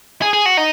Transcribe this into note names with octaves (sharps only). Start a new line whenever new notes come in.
G#4
G#4
F#4
D#4